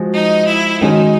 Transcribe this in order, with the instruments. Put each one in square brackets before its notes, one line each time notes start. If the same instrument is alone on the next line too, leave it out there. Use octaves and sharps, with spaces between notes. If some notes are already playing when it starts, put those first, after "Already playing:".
Already playing: [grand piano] F3 G#3 F#4
[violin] D#4
E4
[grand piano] D#3 G#3 C#4 F#4 [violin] D#4